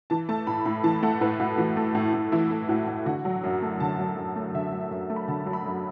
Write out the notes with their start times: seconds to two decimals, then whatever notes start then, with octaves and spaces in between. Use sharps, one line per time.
0.10 E3 A5
0.29 A3 A5
0.47 A2 B5
0.65 A2 B5
0.84 E3 A5
1.03 A3 F#5
1.21 A2 B4
1.40 A2 F#4
1.58 E3 F#4
1.77 A3
1.95 A2
2.14 A2
2.32 E3 E4
2.51 A3
2.69 A2 F#4
2.87 A2
3.06 D3 F#4
3.25 F#3
3.44 F#2
3.62 A3
3.80 D3 A5
3.99 F#3
4.17 F#2
4.36 A3
4.54 D3 E5
4.72 F#3
4.91 F#2
5.10 A3
5.16 B5
5.28 D3 A5
5.46 F#3
5.53 B5
5.65 F#2